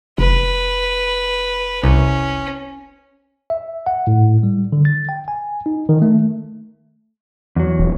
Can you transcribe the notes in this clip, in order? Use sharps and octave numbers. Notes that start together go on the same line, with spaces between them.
F1 B4
C2 C#4
E5
F#5
A2
G3
D3
A6
G5
G#5
D#4
D#3
A3
E2 F#3
D#1